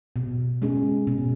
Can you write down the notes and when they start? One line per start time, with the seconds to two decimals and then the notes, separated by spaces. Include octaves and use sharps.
0.16 B2
0.62 G#3 C#4 G#4
1.07 B2